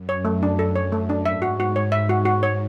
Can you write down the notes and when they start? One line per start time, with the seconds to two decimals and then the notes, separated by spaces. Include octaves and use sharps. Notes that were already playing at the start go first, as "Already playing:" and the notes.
Already playing: F#2
0.09 C#5
0.25 A3
0.43 D4
0.59 A4
0.76 C#5
0.92 A3
1.10 D4
1.25 G#2 E5
1.42 F#4
1.60 F#4
1.76 C#5
1.92 G#2 E5
2.09 F#4
2.25 F#4
2.43 C#5